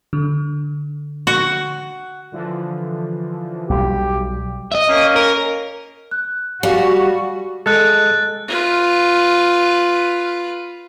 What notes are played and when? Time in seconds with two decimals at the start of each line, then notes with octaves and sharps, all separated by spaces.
0.13 D3
1.27 F#4
2.32 D3 E3 F3
3.69 B1 G3 G4
4.72 D#5 E5
4.88 A#3 C#4
5.16 A#4
6.11 F#6
6.63 G3 F#4 D5 F5 G#5
7.66 G#3 A4 F#6 A6
8.48 F4 B4